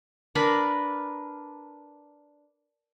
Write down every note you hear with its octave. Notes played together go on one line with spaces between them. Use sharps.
D4 A#4 B4 B5